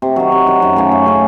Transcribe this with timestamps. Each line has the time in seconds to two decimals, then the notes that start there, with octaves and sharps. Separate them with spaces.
0.02 C3
0.16 D#3 F#3
0.32 C3
0.47 D#3 F#3
0.62 F#2
0.76 C#3 A3 C#4
0.92 F#2
1.06 C#3 A3 C#4